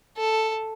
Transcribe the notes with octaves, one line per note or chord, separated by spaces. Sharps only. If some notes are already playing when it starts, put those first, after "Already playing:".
A4